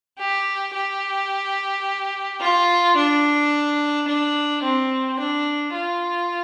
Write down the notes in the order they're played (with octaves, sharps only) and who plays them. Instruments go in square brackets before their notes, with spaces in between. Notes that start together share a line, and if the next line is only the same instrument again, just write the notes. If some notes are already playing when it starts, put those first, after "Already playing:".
[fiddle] G4
G4
F4
D4
D4
C4
D4
F4